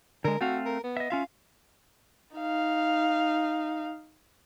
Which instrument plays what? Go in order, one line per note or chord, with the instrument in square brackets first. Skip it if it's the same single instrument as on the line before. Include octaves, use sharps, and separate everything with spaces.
[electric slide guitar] D3 G#3 [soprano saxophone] A#4
[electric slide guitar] A3 C4 F5 [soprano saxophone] F#4
[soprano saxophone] A#4
B3
[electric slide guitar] D#5 E5
[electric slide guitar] C#4 F4 E5 [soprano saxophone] F5
[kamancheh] D#4 F5